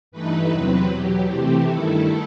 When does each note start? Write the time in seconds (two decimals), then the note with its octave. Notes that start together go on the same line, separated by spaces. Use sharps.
0.12 G2 E3 A3 D#4 B4
0.50 E2 C3 F#3 C4
0.88 E2 B2 F#3 G4
1.27 C3 E3 A3 C4
1.66 G2 D#3 A3 E4 A4